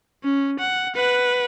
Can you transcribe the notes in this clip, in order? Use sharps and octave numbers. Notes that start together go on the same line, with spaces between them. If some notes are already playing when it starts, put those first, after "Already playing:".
C#4
F#5
B4 F#5